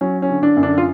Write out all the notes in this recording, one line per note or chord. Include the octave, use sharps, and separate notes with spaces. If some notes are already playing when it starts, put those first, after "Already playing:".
F#3 C#4
C#4
D3
D3 D4
F#2
D3 D4
F4